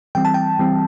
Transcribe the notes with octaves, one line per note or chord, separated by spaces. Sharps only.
E3 G3 C4 G5
A5
G5
E3 G3 C4